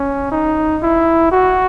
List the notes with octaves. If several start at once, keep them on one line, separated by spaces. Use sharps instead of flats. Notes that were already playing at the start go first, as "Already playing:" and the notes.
Already playing: C#4
D#4
E4
F#4